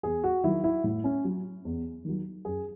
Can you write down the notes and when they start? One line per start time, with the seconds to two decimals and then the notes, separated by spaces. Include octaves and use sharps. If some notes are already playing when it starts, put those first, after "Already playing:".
0.03 E2 G#4
0.24 F#4
0.44 D#3 F#3 E4
0.64 E4
0.84 A2
1.04 C#4
1.24 F#3
1.65 E2
2.05 D#3 F#3
2.45 F#2 G#4